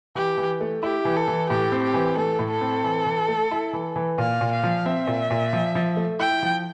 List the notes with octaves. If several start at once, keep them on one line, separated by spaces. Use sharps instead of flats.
E3 G4
E3
A3
E4 G4
E3
A4
E3
A2 G4
C4
G4
E3
A3 A4
A2
A4
C4
E3
E3
A3
E4
E3
E3
A#2 F5
A#2
F5
F3
C4 E5
A#2
A#2
F3
F3
A3
E4 G5
F3